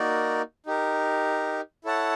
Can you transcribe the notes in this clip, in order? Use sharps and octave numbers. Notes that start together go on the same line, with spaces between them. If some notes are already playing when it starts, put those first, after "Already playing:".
Already playing: A#3 D#4 F#4 A#4 D5
D#4 G4 A#4
E4 A4 C#5 F#5 A5